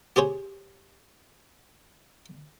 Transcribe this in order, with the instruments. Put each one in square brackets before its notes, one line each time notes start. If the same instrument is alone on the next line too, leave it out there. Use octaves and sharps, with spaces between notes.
[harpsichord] G4 G#4 C5 C#5